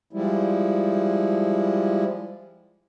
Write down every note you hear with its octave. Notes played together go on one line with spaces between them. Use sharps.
F3 G3 G#3 E4